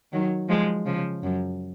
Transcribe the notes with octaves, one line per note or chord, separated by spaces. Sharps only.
D#3 F#3
F3 G#3
C#3 F3
F#2